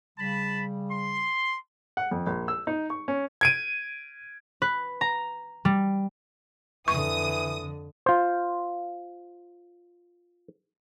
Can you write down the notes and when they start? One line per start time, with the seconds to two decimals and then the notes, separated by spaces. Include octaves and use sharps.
0.18 C#3 G3 A5 B5
0.90 C6
1.97 F#5
2.11 F2
2.27 A#1
2.48 E6
2.67 D#4
2.90 C#6
3.08 C#4
3.41 G#6 D7 D#7
4.62 B4
5.01 A#5
5.65 G3
6.88 F2 D3 E3 C#6 D#6
8.06 F4 C5